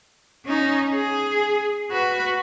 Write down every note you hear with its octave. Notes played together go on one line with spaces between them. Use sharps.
C#4 D#4
G#4
F#4 B4